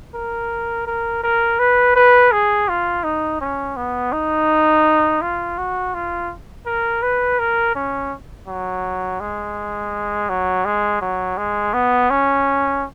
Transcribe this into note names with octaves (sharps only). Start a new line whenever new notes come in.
A#4
A#4
A#4
B4
B4
G#4
F4
D#4
C#4
B3
D#4
F4
F#4
F4
A#4
B4
A#4
C#4
F#3
G#3
F#3
G#3
F#3
G#3
B3
C#4